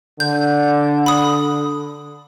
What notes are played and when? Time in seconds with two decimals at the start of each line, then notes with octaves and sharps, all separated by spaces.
0.20 D3 G6
1.06 B5 D#6